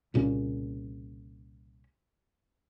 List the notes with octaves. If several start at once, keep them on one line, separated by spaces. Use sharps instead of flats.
C2 A#2 C#3 C#4